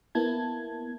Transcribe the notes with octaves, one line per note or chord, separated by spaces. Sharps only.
A#3 B3 E4 A5 G#6